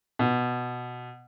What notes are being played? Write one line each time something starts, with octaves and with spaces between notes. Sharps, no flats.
B2